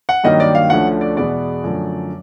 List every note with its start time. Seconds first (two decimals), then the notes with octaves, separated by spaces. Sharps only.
0.09 F#5
0.24 G2 D#3 F#3 A#3 D#4 D#5
0.40 D5
0.55 F5
0.70 D2 D3 F3 A3 C#4 F#5
1.01 D5
1.17 E2 B2 G#3 B3 D5
1.63 F#2 D3 F3 A3